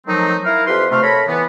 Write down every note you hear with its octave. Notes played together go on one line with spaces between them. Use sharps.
D#3 F3 F#3 A3 C4 D#4
E4 A#4 F5
F2 G4 B4 C6
C3 A3 F5
A4 A#4 C#5 B5
E3 B3